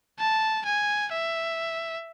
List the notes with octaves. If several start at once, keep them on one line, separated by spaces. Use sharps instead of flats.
A5
G#5
E5